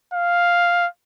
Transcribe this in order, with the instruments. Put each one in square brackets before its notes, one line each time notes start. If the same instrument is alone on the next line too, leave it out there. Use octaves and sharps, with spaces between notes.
[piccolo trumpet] F5